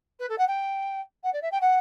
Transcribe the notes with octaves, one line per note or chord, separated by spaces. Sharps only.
B4
A4
F#5
G5
F#5
D5
E5
G5
F#5